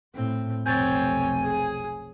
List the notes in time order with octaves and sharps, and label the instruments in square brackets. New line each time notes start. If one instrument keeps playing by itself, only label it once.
[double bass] A2 [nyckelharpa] C4
[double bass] F1 B1 [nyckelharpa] C4 C#5 [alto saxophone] G#5 [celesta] G6 A6
[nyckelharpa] G#4